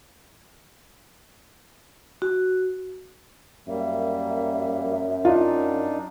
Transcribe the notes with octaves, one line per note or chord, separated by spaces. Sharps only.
F#4
F#2 G3 A#3 E5
D4 D#4 F4